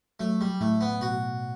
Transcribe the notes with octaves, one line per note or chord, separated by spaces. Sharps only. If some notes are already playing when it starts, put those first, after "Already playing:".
F#3 A3
G3
A2 A3
B3
B2 F#4